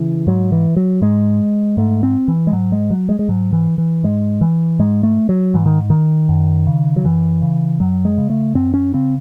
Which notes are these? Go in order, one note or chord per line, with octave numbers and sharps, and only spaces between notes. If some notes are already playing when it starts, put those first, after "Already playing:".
Already playing: C#3 E3
G#2 F#3
E3
F#3
G#2 G#3
G#2 A3
C4
E3
G#3
G#2 F#3
G#3
F#3
G#3
G#3
G#2 F#3
E3
E3
G#2 G#3
E3
G#2 G#3
A3
F#3
G#2 E3
D#3
D#3
F#2
C#3
F#3
F#2 E3
C#3
F#2 F#3
G#3
C#3
A3
F#2 C4
C#4
C#3 C4